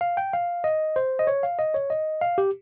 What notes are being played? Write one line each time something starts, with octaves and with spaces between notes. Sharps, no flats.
F5
G5
F5
D#5
C5
D#5
C#5
F5
D#5
C#5
D#5
F5
G4